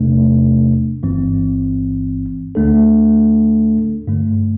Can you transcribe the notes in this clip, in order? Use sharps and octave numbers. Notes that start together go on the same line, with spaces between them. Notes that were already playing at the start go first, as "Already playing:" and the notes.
Already playing: E2 C3 A3 D4
G1 G2 E3 C4
D2 D3 A3 D4 A4
G2 D3 A3